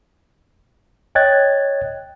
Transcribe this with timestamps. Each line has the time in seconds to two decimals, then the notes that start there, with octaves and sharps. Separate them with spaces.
1.15 C#5 D#5 G5 F#6 G#6 A6